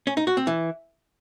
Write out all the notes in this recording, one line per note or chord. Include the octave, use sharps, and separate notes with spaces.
C#4
D#4
F#4
C4
E3